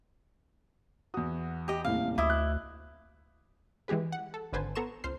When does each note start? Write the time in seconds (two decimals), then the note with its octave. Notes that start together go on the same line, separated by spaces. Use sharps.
1.14 E2 F#4 D#6
1.68 G4 D#5
1.85 D#1 A2 C3 F5
2.18 D2 E4 D#5 D6 E6
2.30 F#6
3.88 E3 G#3 G4 G#4 B4
4.12 F#5
4.34 A4
4.53 G#1 D3 B4 C5 G#5 A5
4.75 B3 A4 A#5 C6 C#6 E7
5.04 C#2 C5 F6 C7